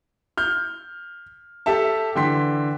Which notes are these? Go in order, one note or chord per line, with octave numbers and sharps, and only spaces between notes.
F6 G6
G4 A4 E5 A5
D3 E3 G5 C6 B6